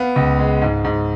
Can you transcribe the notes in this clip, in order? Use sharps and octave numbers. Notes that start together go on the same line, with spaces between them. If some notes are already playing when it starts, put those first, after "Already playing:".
Already playing: B3 F5
C#2
G#3
G#2
G#2